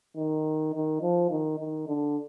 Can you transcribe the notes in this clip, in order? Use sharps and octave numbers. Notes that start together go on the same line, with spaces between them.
D#3
D#3
F3
D#3
D#3
D3